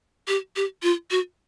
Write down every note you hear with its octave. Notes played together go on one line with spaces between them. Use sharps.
G4
G4
F4
F#4